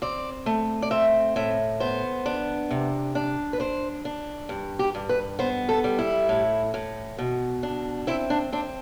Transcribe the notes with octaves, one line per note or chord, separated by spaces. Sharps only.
C4 D5
A3
D5
C4 E5
A2 E5
B3 C5
D4
C3
D4
B4
D4 C5
D4
G2
G4
G2
B4
B3 C5
A4
G3
E4
A2
A2
B2
D4
C4 E4
D4
C4 D4